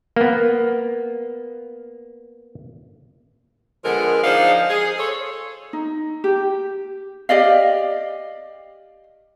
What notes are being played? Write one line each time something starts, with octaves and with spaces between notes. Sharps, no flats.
A#3 B3
D3 F3 G#3 B3 A4 A#4
F3 D4 D#4 G#4 C5 F5
G#4
A4 C5 C#5
D#4
G4
G4 D5 D#5 F5